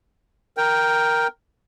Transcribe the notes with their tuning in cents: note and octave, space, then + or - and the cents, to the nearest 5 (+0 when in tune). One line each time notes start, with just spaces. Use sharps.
A#4 +0 G5 +0